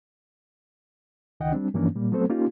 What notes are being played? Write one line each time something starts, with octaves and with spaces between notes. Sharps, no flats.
C#2 D#3 D#5 F#5 G5
G3 C4 D4
G2 E3 F3 A#3 C#4 D4
A#2 G3 A#3
F#3 A3 B3 C4 A4 C5
A#3 C#4 D#4 F4 G4